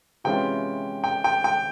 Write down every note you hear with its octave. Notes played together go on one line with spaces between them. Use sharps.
C3 E3 G#3 C#4 F4 G5
G5
G5
G5